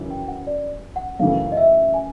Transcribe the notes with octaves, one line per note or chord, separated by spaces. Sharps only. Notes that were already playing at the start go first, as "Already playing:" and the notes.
Already playing: F#2 C#3 E3
G5
F#5
D5
F#5
F#2 C#3 E3 A3 F5
D#5
E5
G#5